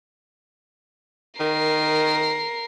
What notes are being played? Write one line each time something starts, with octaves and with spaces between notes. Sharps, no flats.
D#3 A#4 C7